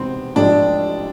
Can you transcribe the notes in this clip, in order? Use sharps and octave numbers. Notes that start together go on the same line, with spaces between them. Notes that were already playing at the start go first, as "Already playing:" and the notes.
Already playing: E1 E2 C3 D#3 B3 C4
A1 G#2 F3 A3 D4